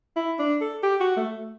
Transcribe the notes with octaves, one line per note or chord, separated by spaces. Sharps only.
E4
D4
A4
G4
F#4
A3